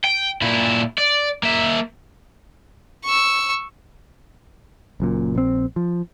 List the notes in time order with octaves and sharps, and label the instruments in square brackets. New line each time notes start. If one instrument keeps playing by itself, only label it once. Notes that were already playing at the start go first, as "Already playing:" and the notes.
[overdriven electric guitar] G5
A#2 E4
D5
A#3 E5
[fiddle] C#6 E6
[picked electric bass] F#1 F#2 A#2
A#1 C4
F3